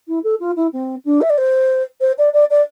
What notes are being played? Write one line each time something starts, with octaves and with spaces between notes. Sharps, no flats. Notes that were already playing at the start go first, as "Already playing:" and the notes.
E4
A4
F4
E4
C4
D4
E5
D5
C5
C5
D5
D5
D5